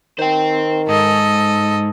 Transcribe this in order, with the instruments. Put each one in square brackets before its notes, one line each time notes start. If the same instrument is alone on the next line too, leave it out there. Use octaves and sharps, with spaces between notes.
[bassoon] D#3 [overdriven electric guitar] C5 G5
[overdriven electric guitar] G#2 [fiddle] A4 D#5